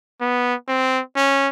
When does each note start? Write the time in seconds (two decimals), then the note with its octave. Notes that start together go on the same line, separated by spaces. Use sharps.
0.21 B3
0.68 C4
1.16 C#4